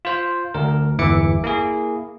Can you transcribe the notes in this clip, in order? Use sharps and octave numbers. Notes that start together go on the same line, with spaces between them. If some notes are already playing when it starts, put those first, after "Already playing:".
F4 C5
D2 A#4
G1 E2 E3 E5 D6 C#7
A#3 E4 G#4